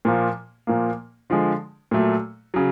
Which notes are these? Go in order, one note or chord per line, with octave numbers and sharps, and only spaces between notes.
A#2 F3 A#3
A#2 F3 A#3
D3 F3 G#3
A#2 F#3 A3
C#3 F#3